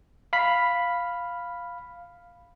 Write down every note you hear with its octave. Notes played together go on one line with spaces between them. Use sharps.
F5 B5 B6